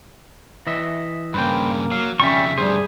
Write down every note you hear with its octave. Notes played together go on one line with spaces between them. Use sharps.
E3 D#5 E5
G2 C#3 A#3 B4 C5 G5
F#3 F5
F2 C#3 G3 C#4 E5 C#6
D2 G2 G3 G#4 C5